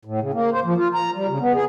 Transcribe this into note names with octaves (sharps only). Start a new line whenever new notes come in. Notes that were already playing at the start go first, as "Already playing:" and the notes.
A2
C#3
A#3
C5
F3
F4
A#5
G3
C#3
B3
G#4